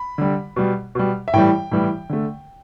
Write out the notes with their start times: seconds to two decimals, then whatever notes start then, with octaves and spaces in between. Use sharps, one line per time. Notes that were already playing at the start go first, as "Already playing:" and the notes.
Already playing: B5
0.18 D3 G3
0.56 B2 G3
0.95 B2 G3
1.28 E5
1.33 A2 E3 G3 G5
1.71 A2 E3 G3
2.09 D3 A3